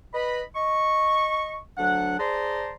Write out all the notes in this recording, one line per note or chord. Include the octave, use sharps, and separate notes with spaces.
B4 D#5 B5
D#5 C#6
D2 F#3 D4 F#5
G#4 C5 D5 A5 A#5 C6